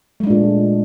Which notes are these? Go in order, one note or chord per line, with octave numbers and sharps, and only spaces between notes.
A#2 G#3 A3 D4